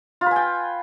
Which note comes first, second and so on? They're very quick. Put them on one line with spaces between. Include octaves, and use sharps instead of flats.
F4 B4 G#5 G5